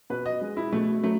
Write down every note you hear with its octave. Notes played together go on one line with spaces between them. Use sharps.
B2 B4
D#5
G#3
E4
B2 A3
F#3 A3